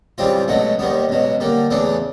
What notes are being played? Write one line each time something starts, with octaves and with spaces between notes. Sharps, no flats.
C#3 E3 G3 C4 F4
C#2 B2 F#3 A3
D#2 D#3 G3 B3
C#2 B2 F#3
D3 G3 A#3
E2 C#3 E3 A3 D4